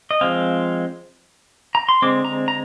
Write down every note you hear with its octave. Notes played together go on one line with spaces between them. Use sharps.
D#5
F3 G#3 C4 F5
A#5
C6
D3 G#3 C4 D6
A#5
A#5